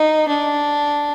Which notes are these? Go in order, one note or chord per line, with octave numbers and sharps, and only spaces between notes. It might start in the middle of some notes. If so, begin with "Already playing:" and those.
Already playing: D#4
D4